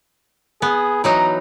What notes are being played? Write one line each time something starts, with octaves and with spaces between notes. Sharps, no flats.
B3 G#4
E3 F#3 D#4 A#5